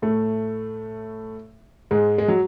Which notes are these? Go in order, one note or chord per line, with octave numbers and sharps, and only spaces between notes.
A2 A3
G#2 G#3
G#3
F#3